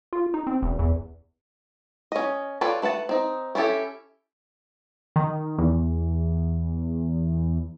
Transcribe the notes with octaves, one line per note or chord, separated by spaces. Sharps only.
F4
D#4
C4
E1
E2
C#4 D#5
F4 A4 B4 C#5 D5
A3 B4 F#5 A5
C4 D#4
C#4 E4 F4 G4 A4
D#3
E2